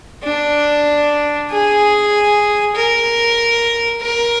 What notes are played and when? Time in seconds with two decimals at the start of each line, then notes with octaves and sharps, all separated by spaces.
0.24 D4
1.51 G#4
2.75 A#4
4.02 A#4